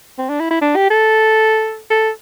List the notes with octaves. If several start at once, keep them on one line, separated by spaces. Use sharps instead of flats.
C4
D4
E4
E4
D4
G4
A4
A4